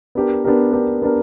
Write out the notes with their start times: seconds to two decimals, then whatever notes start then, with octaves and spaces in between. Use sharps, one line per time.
0.15 B3 D4 G4 A#4
0.44 B3 D4 G4 A#4
0.73 B3 D4 G4 A#4
1.02 B3 D4 G4 A#4